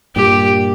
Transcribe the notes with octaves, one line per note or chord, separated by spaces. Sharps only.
G2 A#2 G4